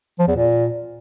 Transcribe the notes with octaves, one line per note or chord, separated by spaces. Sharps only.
F3
E2
A#2